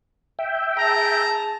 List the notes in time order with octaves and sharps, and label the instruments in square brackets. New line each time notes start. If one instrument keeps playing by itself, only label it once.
[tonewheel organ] E5 G5
[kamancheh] G#4 A5 [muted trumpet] A#5